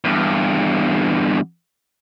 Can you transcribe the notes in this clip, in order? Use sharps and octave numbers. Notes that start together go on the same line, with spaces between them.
E2 G2